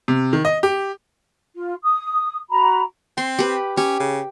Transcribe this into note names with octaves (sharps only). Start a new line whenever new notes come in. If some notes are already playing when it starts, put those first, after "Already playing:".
C3
D#3
D#5
G4
F4
D#6
F#4 A#5 B5
C4 C6
G4 B4
C#4 G4
C#3